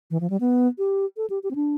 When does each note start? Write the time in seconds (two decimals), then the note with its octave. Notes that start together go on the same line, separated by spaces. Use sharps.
0.11 E3
0.21 F3
0.30 G3
0.40 B3
0.78 G4
1.17 A4
1.30 G4
1.43 G4
1.51 C4
1.55 D4